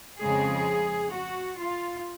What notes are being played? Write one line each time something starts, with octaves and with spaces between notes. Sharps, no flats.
F2 C#3 G#3 G#4
F#4
F4